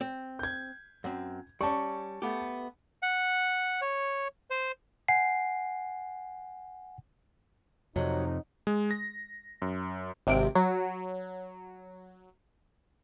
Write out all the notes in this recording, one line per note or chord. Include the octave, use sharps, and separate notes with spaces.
C4
G6 G#6
F#2 C4
G3 C#4 A5 C#6
A3 B3 G4
F#5
C#5
C5
F#5 G#5 C7
F2 C3 F#3 D#4
G#3
A#6
F#2
G#1 C3 D7
F#3